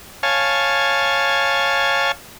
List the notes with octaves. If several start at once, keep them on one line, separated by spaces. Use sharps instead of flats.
C#5 F5 G#5 A5